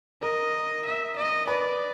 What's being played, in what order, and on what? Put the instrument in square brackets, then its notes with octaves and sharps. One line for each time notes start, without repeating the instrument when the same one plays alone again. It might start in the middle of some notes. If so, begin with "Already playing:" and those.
[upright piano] A#4 [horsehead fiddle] D#5
[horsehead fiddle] E5
D#5
[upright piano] B4 [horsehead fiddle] D5